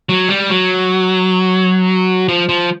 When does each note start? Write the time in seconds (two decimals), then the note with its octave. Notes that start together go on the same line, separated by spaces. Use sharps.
0.09 F#3
0.29 G3
0.49 F#3
2.28 F3
2.49 F3